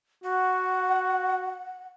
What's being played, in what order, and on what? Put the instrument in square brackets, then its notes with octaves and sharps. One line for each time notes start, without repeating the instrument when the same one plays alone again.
[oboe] F#4 [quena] F#5